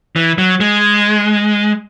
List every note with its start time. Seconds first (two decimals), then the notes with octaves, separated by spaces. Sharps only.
0.16 E3
0.38 F#3
0.60 G#3